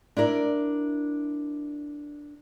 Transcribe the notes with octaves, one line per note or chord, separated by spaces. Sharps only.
D4 E4 A#4 D5